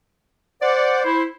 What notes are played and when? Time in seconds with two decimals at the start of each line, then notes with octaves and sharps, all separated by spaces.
0.61 C5 D5 F#5
1.04 E4 C5